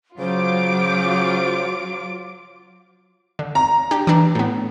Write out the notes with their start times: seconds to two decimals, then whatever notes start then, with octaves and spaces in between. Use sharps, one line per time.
0.19 C#3 F#3 F4 C5 D6 D7
3.39 D3
3.55 A#5
3.91 D4 G4
4.07 E3 D4
4.35 A2 B3